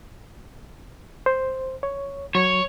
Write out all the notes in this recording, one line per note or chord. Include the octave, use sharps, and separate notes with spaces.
C5
C#5
F#3 C#5